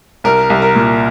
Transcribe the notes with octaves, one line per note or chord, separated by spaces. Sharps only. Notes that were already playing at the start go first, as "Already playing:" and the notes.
C2 A#4
C2
A#4
A#2